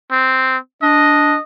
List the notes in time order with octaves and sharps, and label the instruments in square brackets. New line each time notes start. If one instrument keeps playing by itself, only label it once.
[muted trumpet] C4
[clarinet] D4 [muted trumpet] D#5